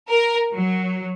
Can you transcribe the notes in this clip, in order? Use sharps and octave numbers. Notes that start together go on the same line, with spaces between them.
A#4
F#3